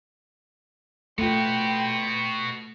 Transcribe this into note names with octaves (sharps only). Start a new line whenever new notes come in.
A3 F4 F#4 B4 G5 C6